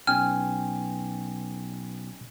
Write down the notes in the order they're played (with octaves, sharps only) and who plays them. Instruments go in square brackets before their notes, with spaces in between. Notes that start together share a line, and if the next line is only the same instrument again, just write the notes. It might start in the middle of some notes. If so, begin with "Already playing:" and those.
[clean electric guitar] B1 [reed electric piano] C#4 G5 G#5 [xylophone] F6